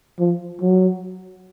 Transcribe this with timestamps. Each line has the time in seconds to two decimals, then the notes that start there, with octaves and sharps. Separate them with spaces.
0.19 F3
0.61 F#3